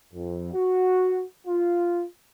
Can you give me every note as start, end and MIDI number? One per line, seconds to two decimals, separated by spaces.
0.13 0.53 41
0.53 1.21 66
1.47 2.03 65